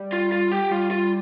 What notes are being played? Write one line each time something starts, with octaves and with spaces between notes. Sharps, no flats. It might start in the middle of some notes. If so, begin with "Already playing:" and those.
Already playing: G3
F4
F4
G4
G3 F4
F4